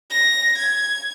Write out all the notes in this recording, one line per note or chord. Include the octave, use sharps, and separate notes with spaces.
A#6
G#6